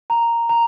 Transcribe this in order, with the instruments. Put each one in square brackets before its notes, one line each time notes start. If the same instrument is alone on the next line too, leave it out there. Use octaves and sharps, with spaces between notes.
[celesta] A#5
A#5